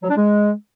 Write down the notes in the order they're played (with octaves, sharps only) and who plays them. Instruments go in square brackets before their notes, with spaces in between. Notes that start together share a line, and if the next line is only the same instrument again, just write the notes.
[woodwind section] F#3
D4
G#3